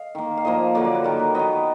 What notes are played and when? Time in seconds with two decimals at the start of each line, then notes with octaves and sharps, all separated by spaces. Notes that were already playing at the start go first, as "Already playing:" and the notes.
Already playing: D#5 F5
0.15 D#3 A#3
0.37 F5
0.45 A#2 F3 A#3 D#5
0.75 D3 F#3 A#3 D5
0.85 D5
0.95 B4
1.04 D#3 A#3 A#4
1.19 B4
1.35 D#3 F#3 B3 D#5